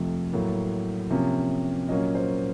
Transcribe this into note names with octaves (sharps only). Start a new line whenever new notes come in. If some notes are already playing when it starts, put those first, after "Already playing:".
Already playing: F2 C3 F3 A3
A2 F#3 A#3
C3 F3 A#3 C#4
A#2 F#3 A#3 C#4 D#5
C5